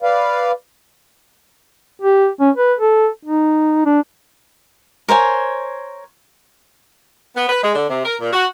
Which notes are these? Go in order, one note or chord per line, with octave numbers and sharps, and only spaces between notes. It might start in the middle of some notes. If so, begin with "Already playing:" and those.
B4 D5 F5
G4
C#4
B4
A4
D#4
D4
A#4 C5 C#5 G#5
B3
B4
G#3
D3
C3
A#4
A#2
F#4